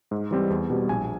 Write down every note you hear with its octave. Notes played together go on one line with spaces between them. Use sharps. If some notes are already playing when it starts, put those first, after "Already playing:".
G#2
E3 G3 C4
E2
B2 G3 C4
A#1 G#5